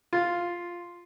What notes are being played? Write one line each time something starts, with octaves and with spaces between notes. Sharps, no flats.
F4